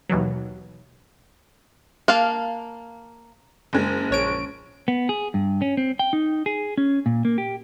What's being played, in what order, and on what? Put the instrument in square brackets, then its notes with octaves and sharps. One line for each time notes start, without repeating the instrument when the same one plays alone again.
[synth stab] D#2 B2 E3 F#3
[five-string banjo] A#3 F5 A5
[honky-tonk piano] F#1 G#3
[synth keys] A#1 C#5 D7
[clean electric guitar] B3
G#4
G2
C#4
C4
G5
D#4
G#4
C#4
A#2
A#3
G4